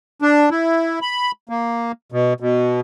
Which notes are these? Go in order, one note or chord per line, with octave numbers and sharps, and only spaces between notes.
D4
E4
B5
A#3
B2
B2